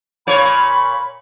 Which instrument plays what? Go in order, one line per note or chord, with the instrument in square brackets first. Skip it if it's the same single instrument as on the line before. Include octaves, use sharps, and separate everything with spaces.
[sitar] A#2 C#5 [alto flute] B5